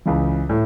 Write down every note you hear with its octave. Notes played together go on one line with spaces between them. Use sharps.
C#2 C#3 E3
A2